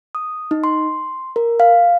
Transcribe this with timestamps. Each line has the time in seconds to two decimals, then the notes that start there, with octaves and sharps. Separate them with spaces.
0.15 D#6
0.51 D#4
0.64 C6
1.36 A#4
1.60 F5